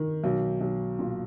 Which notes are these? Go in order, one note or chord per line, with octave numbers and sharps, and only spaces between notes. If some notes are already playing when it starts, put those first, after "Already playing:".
Already playing: D#3
B1
B1
A#2